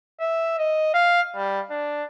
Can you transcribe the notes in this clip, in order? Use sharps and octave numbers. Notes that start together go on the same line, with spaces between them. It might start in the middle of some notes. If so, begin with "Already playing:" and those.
E5
D#5
F5
G3
D4